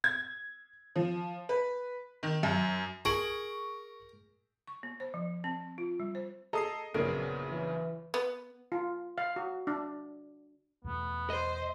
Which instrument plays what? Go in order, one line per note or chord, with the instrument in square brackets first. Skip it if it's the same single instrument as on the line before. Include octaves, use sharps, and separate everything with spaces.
[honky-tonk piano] G#6
F3
B4
D#3
F#2
[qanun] G#4 [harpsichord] A#4 [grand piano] C#6 D7 F#7
[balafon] C#6
B3
C5
F3
C4
F4
G3
C5
[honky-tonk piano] G#4 A4 [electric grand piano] D#5 D#6 C7 [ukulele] A#5
[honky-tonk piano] A#1 F#2 [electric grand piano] C#3 G#4 [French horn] B3 [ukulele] A#4
[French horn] E3
[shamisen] B3
[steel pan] F4
F5
F#4
D4
[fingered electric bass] E2 B2 A3 [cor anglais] B3
[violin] C5 [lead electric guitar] D#5